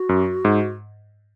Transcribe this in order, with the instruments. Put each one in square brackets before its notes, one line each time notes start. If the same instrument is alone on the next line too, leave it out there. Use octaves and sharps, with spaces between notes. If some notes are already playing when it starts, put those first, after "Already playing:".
Already playing: [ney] F#4
[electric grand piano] F#2
G#2